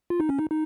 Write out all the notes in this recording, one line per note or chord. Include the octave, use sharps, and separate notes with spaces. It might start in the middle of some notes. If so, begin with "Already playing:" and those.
F4
D#4
C#4
D#4
D#4